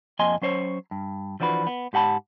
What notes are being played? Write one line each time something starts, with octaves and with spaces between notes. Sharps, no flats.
F2 F3 A#3 D#5 G#5 C6
F#3 C#4 C5 C#5
G2
E3 F3 D4 F#4 B4
B3
G#2 G4 F#5 A5 B5